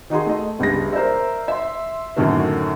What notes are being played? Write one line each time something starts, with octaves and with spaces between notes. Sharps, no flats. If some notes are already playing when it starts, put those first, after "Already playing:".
D#3 D#4 F#4 G#4 C6
A3 D#5
G1 C#2 G2 G#4 A#6
A#4 C5 D5 E5
E5 C6
F#2 A2 D3 D#3 A3 A#3